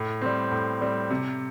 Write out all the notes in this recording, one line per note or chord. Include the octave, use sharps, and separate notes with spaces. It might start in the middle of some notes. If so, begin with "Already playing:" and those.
Already playing: A2
G3 C4
A2
G3 C4
C3